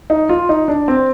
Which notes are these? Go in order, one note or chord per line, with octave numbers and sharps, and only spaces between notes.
D#4
F4
D#4
D4
C4